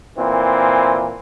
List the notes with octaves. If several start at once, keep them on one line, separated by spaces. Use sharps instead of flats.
A#2 E3 C4